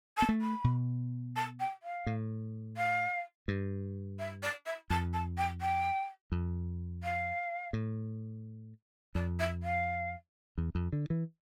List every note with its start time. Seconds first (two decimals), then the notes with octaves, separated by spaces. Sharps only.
0.17 A5
0.22 B3
0.29 A3
0.41 B5
0.64 B2
1.36 A5
1.59 G5
1.82 F5
2.06 A2
2.77 F5
3.48 G2
4.18 E5
4.42 D5
4.66 E5
4.90 F2 A5
5.13 A5
5.37 G5
5.61 G5
6.32 F2
7.03 F5
7.73 A2
9.15 F2 D5
9.39 E5
9.62 F5
10.58 E2
10.75 F2
10.93 D3
11.10 E3